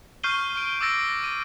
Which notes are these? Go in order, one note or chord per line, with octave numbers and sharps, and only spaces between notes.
C#6 F6 G6 C7 D#7 G7
C#6 D7
D6 E6 A6 A#6 D7
D#7